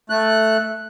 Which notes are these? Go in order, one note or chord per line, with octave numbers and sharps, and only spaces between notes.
A3 F#6